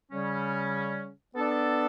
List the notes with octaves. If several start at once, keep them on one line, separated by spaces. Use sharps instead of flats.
C#3 G3 C#4
B3 D4 A4 D5